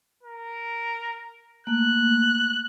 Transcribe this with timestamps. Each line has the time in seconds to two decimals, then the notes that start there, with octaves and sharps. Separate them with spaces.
0.23 A#4
1.67 A3 A#3 F#6